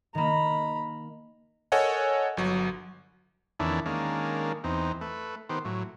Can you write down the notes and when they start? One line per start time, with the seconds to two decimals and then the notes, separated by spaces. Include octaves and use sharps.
0.15 D#3 A#3 A#5 B5
1.72 A4 A#4 C#5 D#5 F#5 G#5
2.37 G1 F#3
3.60 E2 D3 D#3 C#4 D4 E4
3.86 D#3 G#3 A#3 C#4 D4
4.64 E2 C4 D#4
5.01 A3 B4
5.49 D#3 B3 G4 C5
5.65 A2 F#3